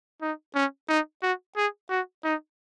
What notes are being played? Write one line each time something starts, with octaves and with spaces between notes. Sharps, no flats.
D#4
C#4
D#4
F#4
G#4
F#4
D#4